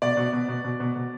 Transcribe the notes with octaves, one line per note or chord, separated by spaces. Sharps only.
B2 D5
B2
B2
B2
B2
B2
B2